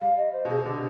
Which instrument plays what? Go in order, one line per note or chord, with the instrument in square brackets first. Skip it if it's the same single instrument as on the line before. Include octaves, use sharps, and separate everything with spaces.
[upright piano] G3 [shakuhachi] F5
[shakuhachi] D#5
C5
[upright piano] B2
[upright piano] C3 [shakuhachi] G#4
[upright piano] D3 [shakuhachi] G4